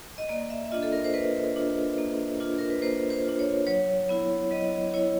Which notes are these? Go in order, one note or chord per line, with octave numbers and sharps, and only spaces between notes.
D#5
A#3 D5
E5
E5
D4 F4 D#5
A4
A#4
C5
A#3 B4
D4 F4
A#3
D4 F4
A#4
B4
A#3 C5
C5
D4 F4
C#5
F#3 C#5
B3 E4
F#3 D#5
B3 E4 C#5